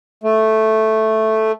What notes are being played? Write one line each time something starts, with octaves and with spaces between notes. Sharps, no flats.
A3